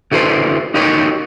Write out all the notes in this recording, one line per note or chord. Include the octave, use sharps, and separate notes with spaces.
D3 E4 F#4 A4 B4 C5
D#4 F#4 G4 A#4 C#5 D#5